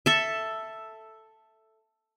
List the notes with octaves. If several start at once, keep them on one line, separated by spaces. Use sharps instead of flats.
A4 E5